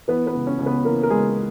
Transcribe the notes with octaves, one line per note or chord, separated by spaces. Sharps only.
E3 B3 B4
B3 B4
C#2
C#4 C#5
C#2
B3 B4
E3 A#3 A#4
A#4
C#2 G#3 G#4